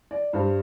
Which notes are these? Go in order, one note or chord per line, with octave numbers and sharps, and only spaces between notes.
D5
G2 G3 C5